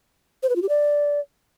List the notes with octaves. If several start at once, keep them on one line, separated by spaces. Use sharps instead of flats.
C5
B4
F4
G4
D5